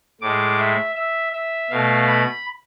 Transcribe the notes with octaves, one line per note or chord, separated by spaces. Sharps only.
A2 G#3 D6
E5
E5
E5
B2 A3 F5
B5